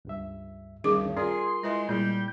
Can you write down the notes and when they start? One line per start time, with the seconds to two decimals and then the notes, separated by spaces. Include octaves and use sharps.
0.05 C#2 G2 E5
0.84 D2 G2 D#3 G3 C#4 G#4 D6
1.17 F4 G#4 A#4 D5 C6
1.63 G#3 E4 B4 E5
1.89 A#2 G3 G#3 E4 G6